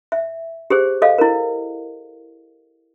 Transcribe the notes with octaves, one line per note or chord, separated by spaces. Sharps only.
E5
G4 G#4 C5
A4 D#5 F5
E4 A#4